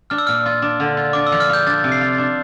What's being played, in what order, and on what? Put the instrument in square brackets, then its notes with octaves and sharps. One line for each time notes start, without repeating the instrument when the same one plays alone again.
[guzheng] D4 [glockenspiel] F6
[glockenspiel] E6
[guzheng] A#2 [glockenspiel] F6
[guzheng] F4
D4
D3
F4
[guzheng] D4 [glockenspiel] D6
[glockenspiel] E6
[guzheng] F3
[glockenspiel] F6
[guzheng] F4 [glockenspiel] G6
[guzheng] D4 [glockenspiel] A6
[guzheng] C3
[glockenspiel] C7
[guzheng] F4
D4